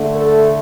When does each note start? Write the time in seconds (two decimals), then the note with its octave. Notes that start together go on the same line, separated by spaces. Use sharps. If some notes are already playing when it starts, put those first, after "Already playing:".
Already playing: D3 A3
0.15 A4